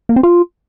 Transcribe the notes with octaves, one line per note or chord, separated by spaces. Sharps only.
A#3
C4
F4